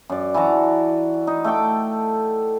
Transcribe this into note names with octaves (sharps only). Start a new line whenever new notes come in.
F#2 D5
E3 F#4 A5 A#5
D#4
A3 A4 G5 D6